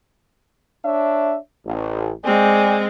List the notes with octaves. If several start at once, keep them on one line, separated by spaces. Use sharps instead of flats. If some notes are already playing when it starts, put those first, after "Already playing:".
D4 C#5 E5
A1
G#3 C4 D5 G5 G#5